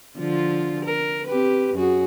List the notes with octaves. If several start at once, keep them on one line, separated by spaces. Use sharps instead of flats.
D3 F3 F4
A#4
C4 G4 B4
F#2 F#4 G#4